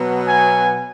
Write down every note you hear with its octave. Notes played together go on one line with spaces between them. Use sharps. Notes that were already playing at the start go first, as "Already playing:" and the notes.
Already playing: B2 F#3 B3
G#5